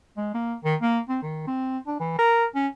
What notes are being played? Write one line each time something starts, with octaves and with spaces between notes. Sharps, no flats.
G#3
A#3
D#3
A#3
C4
D#3
C4
D4
E3
A#4
C#4